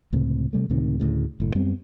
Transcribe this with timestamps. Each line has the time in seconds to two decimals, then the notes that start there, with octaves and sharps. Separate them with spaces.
0.13 C#2 A2 C3
0.53 C3 G3 A3
0.70 C#2 A2 C3 D#3
1.00 D2 A2 C#3
1.40 F#1 A2
1.55 F#2 G3 B3 C4